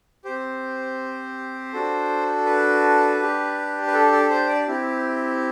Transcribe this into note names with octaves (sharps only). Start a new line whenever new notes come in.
C4 G4 C5
D4 F#4 A4
B4
D4 G4
B4
A4
A4
C5
D5
C4 E4 G4